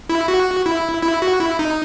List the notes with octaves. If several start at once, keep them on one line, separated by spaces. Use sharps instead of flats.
E4
F#4
E4
E4
F#4
E4
D#4